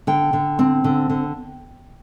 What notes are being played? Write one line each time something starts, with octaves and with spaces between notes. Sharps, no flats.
D3 G5
D3
C4
D3
D3